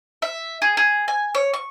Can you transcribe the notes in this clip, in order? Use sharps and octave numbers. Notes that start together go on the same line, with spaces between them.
E5
G#4
G#4
G#5
C#5
C#6